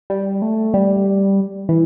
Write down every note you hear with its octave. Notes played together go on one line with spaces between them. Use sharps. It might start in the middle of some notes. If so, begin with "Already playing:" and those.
G3
A3
G3
E3